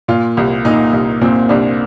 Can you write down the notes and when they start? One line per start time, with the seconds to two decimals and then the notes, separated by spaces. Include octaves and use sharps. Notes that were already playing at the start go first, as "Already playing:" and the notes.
0.08 A#2 F4
0.37 C2
0.65 A#2 D#4
0.93 C2
1.21 A#2 C4
1.49 C2 D4